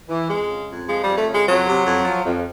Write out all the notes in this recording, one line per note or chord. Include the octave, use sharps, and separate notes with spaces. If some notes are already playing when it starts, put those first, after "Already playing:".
E3
F2 G#3
C#3
F2
F3 G#3
G3
F2
A3
C#3
G#3
F2 F#3
C3
F2
F3
F2